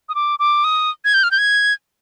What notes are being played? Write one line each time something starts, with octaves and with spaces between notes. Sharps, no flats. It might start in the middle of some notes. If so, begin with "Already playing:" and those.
D#6
D6
D6
D#6
G#6
G6
F6
G6
G#6